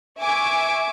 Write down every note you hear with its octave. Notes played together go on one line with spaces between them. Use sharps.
E5 G#5 C#6 D6